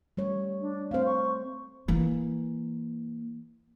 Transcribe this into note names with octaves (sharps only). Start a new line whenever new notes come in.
G3 A3 C#5
D4
A3 C4 C5 F5
C#6
E3 A#3